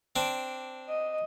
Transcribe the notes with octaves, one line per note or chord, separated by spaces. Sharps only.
C4 D4
D#5